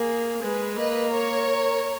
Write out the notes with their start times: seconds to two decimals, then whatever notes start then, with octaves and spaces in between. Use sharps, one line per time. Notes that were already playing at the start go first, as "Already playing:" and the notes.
Already playing: A#3 G#4
0.42 G#3 G#4 B4
0.77 A#3 B4 D#5
1.12 A#4 C#5